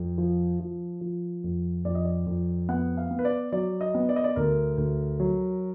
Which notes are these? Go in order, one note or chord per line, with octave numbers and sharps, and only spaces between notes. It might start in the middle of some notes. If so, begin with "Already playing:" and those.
Already playing: F2
F3
F3
F3
F2
F2 D5
D#5
D5
F2
B3 F#5
F5
B3
B4
D5
F#3 D5
D#5
B3
D5
D#5
D5
D2 A#4
D2
F#3